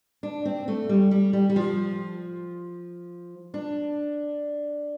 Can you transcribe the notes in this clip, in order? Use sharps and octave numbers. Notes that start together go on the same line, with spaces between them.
D4
C4
A3
G3
G3
G3
G3
F3
D4